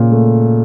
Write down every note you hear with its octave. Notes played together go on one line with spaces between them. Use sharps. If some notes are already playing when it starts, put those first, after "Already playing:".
Already playing: A#2 C#3
A3